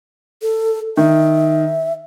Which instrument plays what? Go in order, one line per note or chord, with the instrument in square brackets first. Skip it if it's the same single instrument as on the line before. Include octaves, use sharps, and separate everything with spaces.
[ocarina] A4
[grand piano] D#3 [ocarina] E5